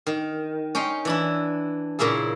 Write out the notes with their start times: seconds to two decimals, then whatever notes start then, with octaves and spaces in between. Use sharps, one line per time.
0.07 D#3
0.75 C#4 D#4 G5 C6
1.05 E3 D4 E4
1.99 A#2 C#3 A#3 E4 G#4